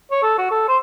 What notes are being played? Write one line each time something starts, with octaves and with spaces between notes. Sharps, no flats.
C#5
A4
F#4
A4
C5